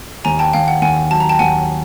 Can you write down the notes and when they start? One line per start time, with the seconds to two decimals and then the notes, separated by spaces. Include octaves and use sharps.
0.25 D#2 G#5 A#5
0.39 G5 A5
0.53 D#2 F5 G5
0.68 F#5
0.82 D#2 F#5 G#5
1.11 F#3 A5
1.20 A#5
1.29 G5 A5
1.39 D#2 F#5 G#5